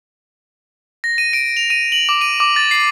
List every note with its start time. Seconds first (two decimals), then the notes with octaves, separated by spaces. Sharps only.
1.04 A#6
1.18 D#7
1.33 D7
1.57 F7
1.70 D#7
1.92 F#7
2.09 D6
2.21 D#7
2.40 D6
2.56 A6
2.71 C7